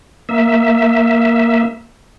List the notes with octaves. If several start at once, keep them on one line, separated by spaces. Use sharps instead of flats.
A#3 E5